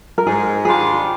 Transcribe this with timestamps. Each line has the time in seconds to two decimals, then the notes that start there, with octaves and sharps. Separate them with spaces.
0.18 A#4
0.26 G#2 G#4
0.65 D#3 G3 D4 F4 G#4